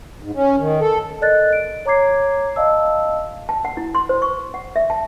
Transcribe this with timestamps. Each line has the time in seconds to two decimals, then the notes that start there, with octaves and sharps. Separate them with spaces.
0.22 G#2
0.34 C#4
0.58 D#3
0.80 A4
1.21 A4 A#4 D5 D#5 F#6 A6
1.53 D7
1.86 C#5 A#5 D6 G#6 C7
2.56 D5 D#5 F5 A5 E6
3.49 A5
3.65 F#5
3.77 E4
3.95 C6
4.09 C5
4.22 C#6
4.54 F#5
4.76 E5
4.90 A5